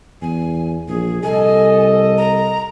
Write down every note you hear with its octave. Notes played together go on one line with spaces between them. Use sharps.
E2 G#5
A#1 G#4
C2 A4 D#5 G#5
A#5